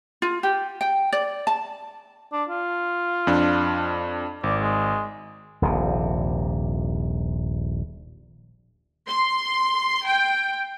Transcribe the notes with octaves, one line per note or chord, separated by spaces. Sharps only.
F4
G4
G5
D5
A5
D4
F4
F2 D4
G#1 D5
G#3
D#1 A#1 C3
C6
G5